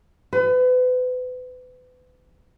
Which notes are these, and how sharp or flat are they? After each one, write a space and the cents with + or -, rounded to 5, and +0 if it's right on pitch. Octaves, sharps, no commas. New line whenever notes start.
B4 +35